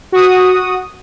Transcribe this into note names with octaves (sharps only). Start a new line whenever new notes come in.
F#4 D#6